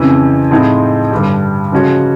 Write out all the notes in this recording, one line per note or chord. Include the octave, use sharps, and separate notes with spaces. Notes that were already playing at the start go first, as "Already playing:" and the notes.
Already playing: F2 C#3 E3
A2 F3 G#3 C4 D#4
G2 D3 G3
C#3 F3 G#3 C#4 F#4